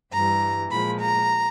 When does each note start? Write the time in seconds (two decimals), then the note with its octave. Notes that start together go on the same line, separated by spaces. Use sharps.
0.12 G2 E3 G3 A#5
0.70 A#2 F3 G#3 B5
1.00 A#5